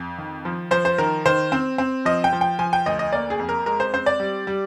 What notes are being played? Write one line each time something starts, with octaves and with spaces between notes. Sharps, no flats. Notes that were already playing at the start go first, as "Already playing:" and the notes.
Already playing: F2
D#3
F3
F3 C5
C5
D#3 A#4
D#3 C5
C4
C4
F3 D#5
G5
F3
G5
F3 G#5
G5
D2 D#5
D#5
A#3 D5
G#4
F2
A#4
G#3 A#4
C5
C4 C5
D5
G3
G3